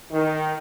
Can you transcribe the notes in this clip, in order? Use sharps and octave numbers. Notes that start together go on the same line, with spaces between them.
D#3